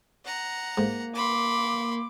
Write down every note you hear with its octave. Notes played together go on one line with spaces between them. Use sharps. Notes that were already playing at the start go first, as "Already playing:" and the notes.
F#5 A#5
G#2 A#3
B5 C6 D6